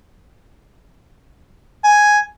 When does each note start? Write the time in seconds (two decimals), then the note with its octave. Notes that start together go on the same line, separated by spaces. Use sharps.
1.85 G#5